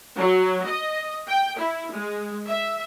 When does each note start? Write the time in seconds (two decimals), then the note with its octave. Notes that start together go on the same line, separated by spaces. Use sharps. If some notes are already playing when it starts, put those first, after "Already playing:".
0.18 F#3
0.66 D#5
1.28 G5
1.58 E4
1.91 G#3
2.47 E5